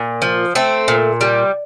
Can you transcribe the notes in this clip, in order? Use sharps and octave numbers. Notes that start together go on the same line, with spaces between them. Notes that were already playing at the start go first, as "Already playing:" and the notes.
Already playing: A#2
F3
A3 C4
A#2
G3